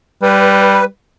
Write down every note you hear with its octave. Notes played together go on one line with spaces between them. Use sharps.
G3 B4